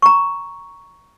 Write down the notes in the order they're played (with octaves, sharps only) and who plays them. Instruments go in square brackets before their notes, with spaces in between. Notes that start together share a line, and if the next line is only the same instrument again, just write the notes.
[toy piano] A#5 C#6